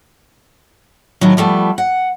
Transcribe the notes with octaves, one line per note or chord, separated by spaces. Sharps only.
A2 D#3 F#3
F3 G3 A3 B3
F#5